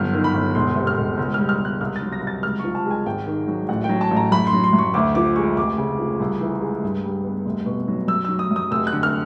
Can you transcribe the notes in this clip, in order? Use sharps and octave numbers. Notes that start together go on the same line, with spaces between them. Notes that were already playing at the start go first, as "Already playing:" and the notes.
Already playing: G1 F#2 F6
D#3
B5
G1
E1 C6
C3
F6
E1
C#2
G3 F6
F6
C#2
F#6
C2 F6
A6
F#3
A#6
C2
A6
C#2 F6
F3 C#6
A5
G#3
G#5
G#1 G5
D#3
F#3
A1 F#5
G5
F#3
A5
A1
A#5
F#2 B5
C6
F#3
C6
F#2
C#6
D2 D6
F3 D6
G#3 C#6
F1 D6
C#3
F3
C2
E3
G#3
G2
G3
B3
F1
B2
F#3
F#2 E6
F#3 E6
D#6
F#2
D#6
F1 E6
F#6
D3
F6